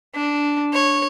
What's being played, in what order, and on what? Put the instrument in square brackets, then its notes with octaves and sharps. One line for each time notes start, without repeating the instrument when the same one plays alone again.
[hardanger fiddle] D4
C#5